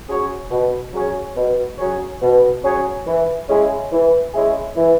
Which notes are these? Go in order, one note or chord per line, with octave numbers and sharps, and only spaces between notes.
F#3 C#4 G#4 C#5
B2
F#3 C#4 G#4 C#5
B2
F#3 C#4 G#4 C#5
B2
F#3 C#4 G#4 C#5
E3
G#3 C#4 E4 G#4
E3
G#3 C#4 E4 G#4
E3